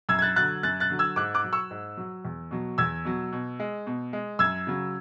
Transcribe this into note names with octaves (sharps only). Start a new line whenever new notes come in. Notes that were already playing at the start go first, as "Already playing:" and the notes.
F#2 E6 G#6
G#6
F#6 A6
D3 F#3 F#6 A6
F#2 F#6 A6
F#6 A6
D3 F#3
E6 G#6
G#2 D6 F#6
D6 F#6
F#3
C#6 E6
G#2
F#3
E2
B2 F#3
E2 E6 G#6
B2 F#3
B2
G#3
B2
G#3
F#2 E6 G#6
C#3 F#3